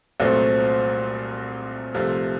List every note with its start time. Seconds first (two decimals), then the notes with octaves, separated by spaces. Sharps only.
0.20 C2 A#2 F#3 A3 C4
1.94 C2 C3 F3 A3